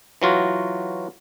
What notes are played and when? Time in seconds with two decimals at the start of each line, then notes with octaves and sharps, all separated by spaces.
0.22 E3 F#3 F4 F#4